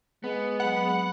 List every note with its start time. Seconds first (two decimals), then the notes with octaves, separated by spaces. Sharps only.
0.24 G#3 B3
0.60 F#3 G#4 F#5 B5